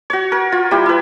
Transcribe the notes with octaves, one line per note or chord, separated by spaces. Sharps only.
F#4 C#5
A#4
F4
G3 E4 G4 G5
E4 B4